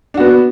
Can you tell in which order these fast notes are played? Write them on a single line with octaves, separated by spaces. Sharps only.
D4 F#4 B3